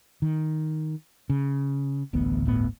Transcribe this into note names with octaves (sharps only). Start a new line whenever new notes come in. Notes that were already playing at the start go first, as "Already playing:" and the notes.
D#3
C#3
D1 A1 D2 B3
D1 G1 A2 B3